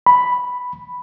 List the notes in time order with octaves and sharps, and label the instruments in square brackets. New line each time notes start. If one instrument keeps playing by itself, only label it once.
[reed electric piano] B5